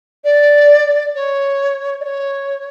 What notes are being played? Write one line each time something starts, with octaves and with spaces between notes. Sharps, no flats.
D5
C#5
D5
C#5